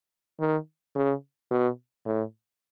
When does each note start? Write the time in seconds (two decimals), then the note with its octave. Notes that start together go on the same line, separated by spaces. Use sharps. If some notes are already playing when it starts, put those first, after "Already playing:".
0.39 D#3
0.95 C#3
1.51 B2
2.05 A2